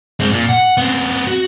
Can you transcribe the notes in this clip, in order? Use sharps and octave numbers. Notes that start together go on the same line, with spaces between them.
G#3 C4
A#2
F#5
B3 C4
F#4